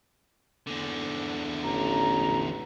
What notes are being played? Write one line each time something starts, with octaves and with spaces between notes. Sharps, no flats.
E2 D3
A1 A#5